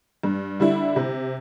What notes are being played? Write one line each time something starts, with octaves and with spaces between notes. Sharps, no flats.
G2
D3 G3 E4
C3